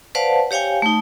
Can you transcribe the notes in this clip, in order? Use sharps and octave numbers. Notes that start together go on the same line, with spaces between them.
B4 C5 D5 F5 F#5 A5
G4 C#5 F5 G5 G#5
A3 D#4